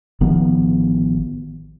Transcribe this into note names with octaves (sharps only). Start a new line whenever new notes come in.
A1 D#3 F3 B3